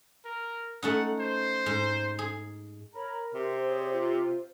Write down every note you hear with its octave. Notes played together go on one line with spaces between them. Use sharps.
A#4
A3 C#4 D#4 F#5
C5
G#2
G#4
A#4 C#5 A#5 B5
C3 C5
G#4 C#5 D5
F4